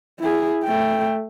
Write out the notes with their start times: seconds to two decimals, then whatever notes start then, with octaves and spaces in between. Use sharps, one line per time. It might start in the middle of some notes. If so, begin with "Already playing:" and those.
0.19 E4 G#4
0.64 A3 G5